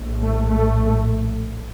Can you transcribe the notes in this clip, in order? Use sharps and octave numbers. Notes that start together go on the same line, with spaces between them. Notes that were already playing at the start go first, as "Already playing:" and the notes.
Already playing: A#1 A2
A3
A3